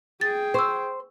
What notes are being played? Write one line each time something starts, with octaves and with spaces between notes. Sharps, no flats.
G#4 G5 A6
C5 C#6 E6